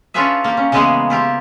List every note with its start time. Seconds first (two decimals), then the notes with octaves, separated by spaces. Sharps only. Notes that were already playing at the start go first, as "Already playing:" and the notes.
0.14 C#4 D4 F4 G#4 B4 E5
0.44 A#3 G4
0.57 C#4
0.72 C#3 E3 G#3 A#3 B3 G#4
1.10 E4 F4 G4